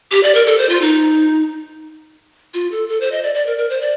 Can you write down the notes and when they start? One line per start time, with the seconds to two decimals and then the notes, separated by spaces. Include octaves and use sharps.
0.12 G4
0.23 D5
0.35 A#4
0.46 A4
0.58 C5
0.69 F4
0.81 D#4
2.54 F4
2.72 A4
2.89 A4
3.01 C5
3.12 D#5
3.23 D5
3.34 D5
3.47 A#4
3.58 A#4
3.70 C5
3.81 D5